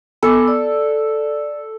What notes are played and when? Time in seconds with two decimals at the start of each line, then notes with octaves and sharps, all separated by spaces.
0.23 B3 A4 G#5 D6
0.48 D5